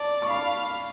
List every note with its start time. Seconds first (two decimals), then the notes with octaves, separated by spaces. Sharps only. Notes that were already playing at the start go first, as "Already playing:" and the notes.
Already playing: D5 A5
0.22 C#6
0.29 F5 B5